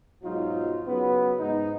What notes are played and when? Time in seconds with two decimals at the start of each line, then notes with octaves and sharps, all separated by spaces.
0.22 B1 G#2 F#3 D#4 F4
0.87 C#3 F#3 B3
1.39 G#2 D#4